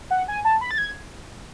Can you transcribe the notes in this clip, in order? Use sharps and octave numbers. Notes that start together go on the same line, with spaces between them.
F#5
G#5
A5
B5
A6
G#6